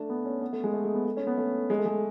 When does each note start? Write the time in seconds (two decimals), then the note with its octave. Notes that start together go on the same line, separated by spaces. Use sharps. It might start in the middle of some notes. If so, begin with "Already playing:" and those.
Already playing: A3 D4
0.09 B3
0.25 C#4
0.42 B3
0.53 A3
0.63 G#3
0.74 A3
0.84 G#3
0.95 B3
1.05 A3
1.17 C#4
1.27 B3
1.38 A3
1.70 G#3
1.79 A3
1.85 G#3